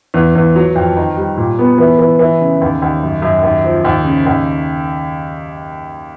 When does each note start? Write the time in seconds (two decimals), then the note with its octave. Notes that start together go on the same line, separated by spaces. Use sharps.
0.14 E2
0.35 E2
0.56 F#3
0.75 F2
0.96 D#3
1.17 G3
1.37 A#2
1.59 B3
1.78 E3
1.99 E3
2.19 E3
2.41 C#3
2.61 D#2
2.82 D#2
3.03 F#2
3.22 F#2
3.43 D#2
3.64 F3
3.84 D#2
4.05 C#3
4.26 D#2